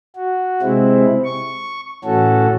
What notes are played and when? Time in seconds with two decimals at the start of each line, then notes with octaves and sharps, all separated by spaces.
0.16 F#4
0.62 C3 G#3 C4 E4
1.25 C#6
2.05 A2 E3 C#4 F#4 A4